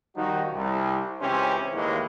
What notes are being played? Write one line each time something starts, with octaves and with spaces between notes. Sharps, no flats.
D#3 F3 G3 D#4 F#4
C2
C#2 E3 C4 C#4 G4 C5
D#2 A2 E3 G#3 A#3